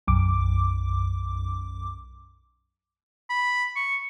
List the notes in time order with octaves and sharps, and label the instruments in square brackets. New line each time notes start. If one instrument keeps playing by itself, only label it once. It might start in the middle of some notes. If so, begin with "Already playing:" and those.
[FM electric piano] B1 F#2 D6
[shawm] B5
C#6